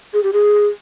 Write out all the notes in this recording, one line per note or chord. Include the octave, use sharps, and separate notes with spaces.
G#4
G4
G#4